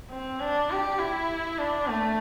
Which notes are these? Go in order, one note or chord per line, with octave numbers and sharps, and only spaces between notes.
C4
D4
G4
E4
D4
A3